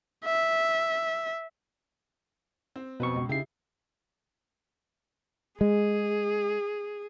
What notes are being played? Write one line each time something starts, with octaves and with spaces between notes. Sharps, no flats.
E5
C4
F2 B2 C4 B4 C#6
C#2
C#3 D#4 E4 G4 C7
G#3 G#4